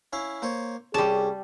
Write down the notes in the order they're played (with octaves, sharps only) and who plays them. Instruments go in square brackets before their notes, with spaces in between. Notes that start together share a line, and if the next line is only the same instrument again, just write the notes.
[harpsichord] C#4 E4 F5
A#3 C5 C#5
[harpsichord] C2 C#4 D6 [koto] G3 A5 [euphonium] G#4